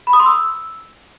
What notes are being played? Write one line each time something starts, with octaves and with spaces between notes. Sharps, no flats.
B5
D#6
C6
E6